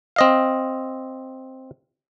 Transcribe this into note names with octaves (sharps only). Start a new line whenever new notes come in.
C4 D#5 F5